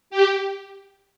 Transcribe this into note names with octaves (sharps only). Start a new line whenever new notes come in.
G4